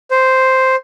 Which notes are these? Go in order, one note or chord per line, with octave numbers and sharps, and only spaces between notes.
C5